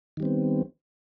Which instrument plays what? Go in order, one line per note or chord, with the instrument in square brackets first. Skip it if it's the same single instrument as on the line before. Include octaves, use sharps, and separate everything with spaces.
[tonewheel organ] D#3
G3
C4
B3